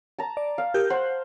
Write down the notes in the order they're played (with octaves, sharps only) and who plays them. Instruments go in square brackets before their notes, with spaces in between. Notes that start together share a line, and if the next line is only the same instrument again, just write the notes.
[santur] A5 A#5
[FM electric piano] D5
[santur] F5
[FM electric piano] G4 A#4 G6
[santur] C5 [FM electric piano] F#5